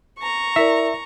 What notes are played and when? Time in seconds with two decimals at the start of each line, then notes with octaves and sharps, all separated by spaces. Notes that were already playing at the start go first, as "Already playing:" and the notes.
0.19 A#5 C#6
0.56 E4 A#4 D5 E5